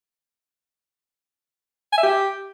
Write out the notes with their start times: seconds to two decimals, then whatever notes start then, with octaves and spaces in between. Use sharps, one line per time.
1.93 G#5
1.98 E5
2.03 G4